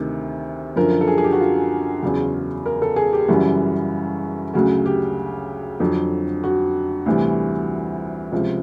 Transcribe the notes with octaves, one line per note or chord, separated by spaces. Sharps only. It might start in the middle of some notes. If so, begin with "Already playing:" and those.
Already playing: D2 C3 D#3
F#2 D3 F3 A#4
A4
G#4
G#4
G4
F#4
F4
E2 C#3 F#3
A#4
A4
G#4
G4
F#2 C#3 E3 G3 F#4
D2 C#3 F#3 F#4
G4
F2 D3 F#3
F#4
D2 C3 E3 G3
C#2 C3 F3